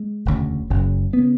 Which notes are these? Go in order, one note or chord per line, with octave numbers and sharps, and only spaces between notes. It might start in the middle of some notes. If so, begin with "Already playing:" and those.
Already playing: G#3
E1 D2 C#3
F#1 F#2 C#3
C#3 B3